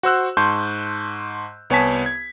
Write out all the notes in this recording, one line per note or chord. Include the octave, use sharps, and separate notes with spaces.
F#4 C5 E6 F#6
G#2 A5 C6 C#6 G6
C2 B3 C#5 G#5 A5 B6
G#6